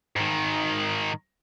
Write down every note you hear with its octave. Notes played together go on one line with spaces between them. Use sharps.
G#2 D#3